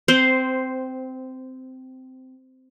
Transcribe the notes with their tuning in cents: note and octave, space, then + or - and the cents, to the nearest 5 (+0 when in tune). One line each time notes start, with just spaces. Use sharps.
C4 -15 C5 +0